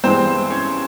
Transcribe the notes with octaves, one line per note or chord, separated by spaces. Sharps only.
G2 E3 G#3 B3 C4 C5
C#4 C#5